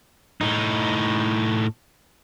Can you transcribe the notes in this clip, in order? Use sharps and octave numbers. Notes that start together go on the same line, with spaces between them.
A2 D#4